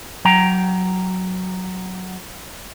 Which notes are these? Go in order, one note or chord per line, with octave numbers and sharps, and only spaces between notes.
F#3 G5 A#5